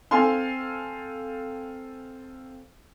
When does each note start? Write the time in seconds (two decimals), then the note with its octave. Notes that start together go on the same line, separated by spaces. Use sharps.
0.11 C4 A4 F5 G#5 C6